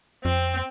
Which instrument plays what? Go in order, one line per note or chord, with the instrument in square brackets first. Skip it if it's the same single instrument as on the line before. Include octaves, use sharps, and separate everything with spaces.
[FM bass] F2 [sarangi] C4